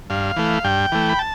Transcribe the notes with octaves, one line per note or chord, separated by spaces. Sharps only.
G2 F5
E3 A3
G2 G5
E3 A3
B5
A5